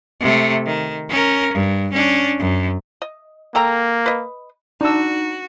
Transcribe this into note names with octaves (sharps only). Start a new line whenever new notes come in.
C3 A3
D#3
C#4 A#4
G2
C#4 D4
F#2
D#5
A#3 A4 G5 A#5
B4 D#5
D4 D#4 F#4 E6